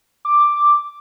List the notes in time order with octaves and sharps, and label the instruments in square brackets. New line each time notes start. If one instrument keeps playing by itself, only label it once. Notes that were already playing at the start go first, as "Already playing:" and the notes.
[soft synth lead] D6